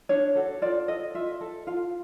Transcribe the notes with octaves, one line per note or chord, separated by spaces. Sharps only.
D4 C#5
F#4 A4
F4 D5
A4 D#5
F4 E5
A4
F4 F5